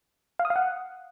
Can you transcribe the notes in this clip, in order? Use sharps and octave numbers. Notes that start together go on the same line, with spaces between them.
F5
D#6
F5
F#5